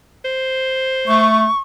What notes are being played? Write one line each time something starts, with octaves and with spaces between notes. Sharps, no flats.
C5
A3 C#6